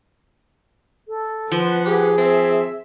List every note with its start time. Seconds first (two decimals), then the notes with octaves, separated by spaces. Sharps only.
1.08 A4
1.52 F3 B4 F#5
1.85 G4 G#4
2.18 C4 E5